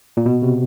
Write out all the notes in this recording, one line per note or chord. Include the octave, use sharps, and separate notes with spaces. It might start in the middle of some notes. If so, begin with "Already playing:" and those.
A#2
B2
C3